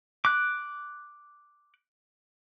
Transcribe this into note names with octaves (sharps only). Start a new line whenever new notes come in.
D6 F#6